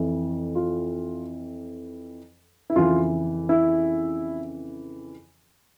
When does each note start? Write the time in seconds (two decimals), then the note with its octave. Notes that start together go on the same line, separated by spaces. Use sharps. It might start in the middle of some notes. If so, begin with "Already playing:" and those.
Already playing: F2 E3
0.55 F4
2.70 E4
2.75 F2 C#3 E3 F4
3.49 E4